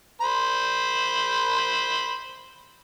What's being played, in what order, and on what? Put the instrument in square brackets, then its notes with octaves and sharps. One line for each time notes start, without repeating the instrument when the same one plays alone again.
[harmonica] C5 B5